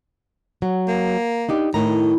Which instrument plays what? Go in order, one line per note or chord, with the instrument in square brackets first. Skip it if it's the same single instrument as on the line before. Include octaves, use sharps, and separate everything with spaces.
[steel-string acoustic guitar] F#3
[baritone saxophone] A#3
[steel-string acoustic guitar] D4 D#4 G4
[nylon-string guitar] A2 [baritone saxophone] D#3 [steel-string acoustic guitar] A#5